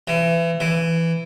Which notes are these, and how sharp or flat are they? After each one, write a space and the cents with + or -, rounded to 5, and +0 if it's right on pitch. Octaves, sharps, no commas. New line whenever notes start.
E3 +30
E3 +10